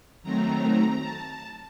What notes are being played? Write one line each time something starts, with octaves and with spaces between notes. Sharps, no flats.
D#3 F#3 A3 C4 A#5
A5